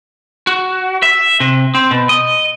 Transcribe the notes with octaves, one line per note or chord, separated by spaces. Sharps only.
F#4
E5
C3
C4
B2
D#5